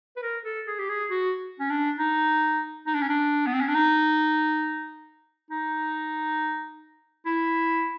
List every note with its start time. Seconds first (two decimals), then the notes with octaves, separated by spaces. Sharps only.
0.16 B4
0.23 A#4
0.45 A4
0.67 G#4
0.79 G4
0.89 G#4
1.11 F#4
1.60 C#4
1.70 D4
1.99 D#4
2.87 D#4
2.94 D4
3.02 C#4
3.09 D4
3.47 B3
3.54 C4
3.61 C#4
3.68 D4
3.75 D#4
5.50 D#4
7.26 E4